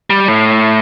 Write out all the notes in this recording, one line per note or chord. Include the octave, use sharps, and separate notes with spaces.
G3
A2